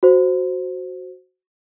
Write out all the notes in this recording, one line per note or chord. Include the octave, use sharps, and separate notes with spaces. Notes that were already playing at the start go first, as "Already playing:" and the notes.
F#4 C5